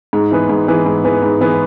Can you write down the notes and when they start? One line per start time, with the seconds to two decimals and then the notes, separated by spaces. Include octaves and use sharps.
0.13 G#2
0.31 E3 B3 G#4 B4
0.49 G#2
0.68 E3 B3 G#4 B4
0.86 G#2
1.04 E3 B3 G#4 B4
1.23 G#2
1.41 E3 B3 G#4 B4